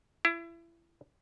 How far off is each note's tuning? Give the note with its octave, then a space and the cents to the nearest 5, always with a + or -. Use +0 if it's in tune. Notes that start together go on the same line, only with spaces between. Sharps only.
E4 +30